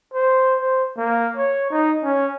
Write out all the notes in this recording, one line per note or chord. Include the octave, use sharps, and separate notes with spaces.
C5
C5
A#3
C#5
D#4
C#4